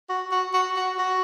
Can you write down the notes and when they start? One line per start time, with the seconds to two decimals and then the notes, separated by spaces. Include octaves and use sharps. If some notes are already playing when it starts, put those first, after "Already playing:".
0.09 F#4
0.32 F#4
0.54 F#4
0.76 F#4
0.99 F#4